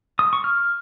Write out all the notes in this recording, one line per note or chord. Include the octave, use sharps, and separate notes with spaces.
D#6
C#6
F6